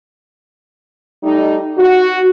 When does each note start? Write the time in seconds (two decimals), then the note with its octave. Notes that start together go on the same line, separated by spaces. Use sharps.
1.23 G3 A3 D#4
1.78 F#4